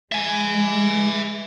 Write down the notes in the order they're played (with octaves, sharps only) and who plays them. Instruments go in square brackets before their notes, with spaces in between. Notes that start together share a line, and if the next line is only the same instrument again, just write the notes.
[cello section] G#3 [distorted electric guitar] E5 G#5